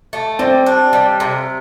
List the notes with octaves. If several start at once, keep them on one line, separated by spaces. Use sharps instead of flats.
A3
G3 C4
D4
G3
C3